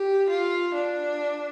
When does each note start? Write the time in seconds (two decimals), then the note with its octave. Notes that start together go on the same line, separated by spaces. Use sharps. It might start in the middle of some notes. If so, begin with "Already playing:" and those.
Already playing: G4
0.30 F4
0.74 D4